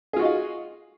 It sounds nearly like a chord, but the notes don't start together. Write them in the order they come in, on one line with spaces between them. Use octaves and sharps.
G#4 F4 F#4 D#5 F5